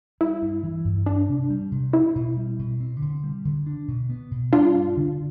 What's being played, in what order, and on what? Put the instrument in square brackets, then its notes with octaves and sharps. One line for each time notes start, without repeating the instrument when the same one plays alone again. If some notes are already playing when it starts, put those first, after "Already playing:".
[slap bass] G3 [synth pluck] E4
[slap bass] G2
E3
G2
[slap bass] C4 [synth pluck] D4
[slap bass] C3
G3
C3
[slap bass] C4 [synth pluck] E4
[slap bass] B2
G3
B2
C4
D3
G3
D3
D4
B2
B3
B2
[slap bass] G3 [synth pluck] D4 F4
[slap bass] G2
D3